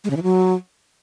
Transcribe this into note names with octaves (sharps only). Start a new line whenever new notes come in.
G#3
C#3
E3
F#3